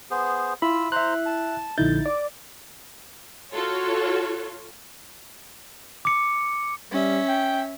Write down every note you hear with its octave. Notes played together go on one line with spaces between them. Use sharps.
B3 G#4 C5
E4 F4 B5 E6
C5 E5 A#5 C6 F#6
A5
A#1 D3 D#4 E4 G6 A6
D5 D6
F4 F#4 A4 C#5
D6 C#7
G3 C#4 E5
G5